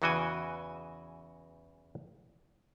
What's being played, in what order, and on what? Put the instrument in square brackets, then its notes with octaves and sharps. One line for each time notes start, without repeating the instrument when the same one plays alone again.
[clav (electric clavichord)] E2 C#3 E3 F#4 G5 G#5